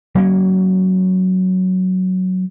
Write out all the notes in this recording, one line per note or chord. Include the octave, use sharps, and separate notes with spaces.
F#3 A#3 C#4